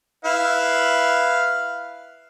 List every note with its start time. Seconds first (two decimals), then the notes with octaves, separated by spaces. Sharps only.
0.25 E4 B4 F5